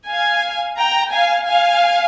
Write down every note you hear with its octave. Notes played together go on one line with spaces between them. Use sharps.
F5 G#5
G5 A#5
F5 G#5
F5 G#5